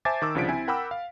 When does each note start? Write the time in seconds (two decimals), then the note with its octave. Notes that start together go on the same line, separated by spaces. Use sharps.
0.05 C5 E5 G#5 A5 D6 A6
0.22 D#3 D6 E6
0.35 C2 C#3 F3 D4 B6 D7
0.48 C4 E4 G#5
0.67 A#4 F#5 G5 B5 D6 E6
0.91 F5